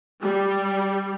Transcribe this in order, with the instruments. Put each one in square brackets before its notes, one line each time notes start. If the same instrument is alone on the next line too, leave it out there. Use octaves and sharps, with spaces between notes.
[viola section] G3